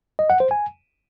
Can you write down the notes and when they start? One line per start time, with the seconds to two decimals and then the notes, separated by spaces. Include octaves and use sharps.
0.19 D#5
0.30 F#5
0.40 C5
0.51 G#5